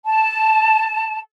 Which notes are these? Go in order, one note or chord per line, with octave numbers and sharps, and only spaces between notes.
A5